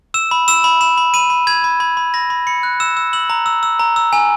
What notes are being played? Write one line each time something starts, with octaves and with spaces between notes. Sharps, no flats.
E6 E7
B5
E6 E7
B5
B5 E7
B5
B5 D#7
B5
B5 G#6
B5
B5 G#6
B5
B5 A#6
B5
B5 C#7
F#6
E6 E7
E6
E6 F#7
A#5
E6
E6
A#5
E6
G#5